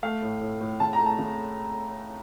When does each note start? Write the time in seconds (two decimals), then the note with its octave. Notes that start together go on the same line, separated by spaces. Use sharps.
0.03 A3 F5
0.22 A2
0.41 A2
0.61 A2
0.80 C#3 A5
0.93 A#5
0.99 A3
1.06 A5
1.19 C#3